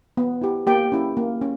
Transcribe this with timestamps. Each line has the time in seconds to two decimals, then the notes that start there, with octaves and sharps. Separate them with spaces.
0.17 B3
0.42 E4 G4
0.67 A#3 G4 G5
0.92 C#4 E4
1.17 A#3
1.41 C#4